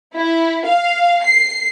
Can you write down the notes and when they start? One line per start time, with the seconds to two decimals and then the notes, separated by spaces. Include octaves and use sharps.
0.16 E4
0.67 F5
1.24 C7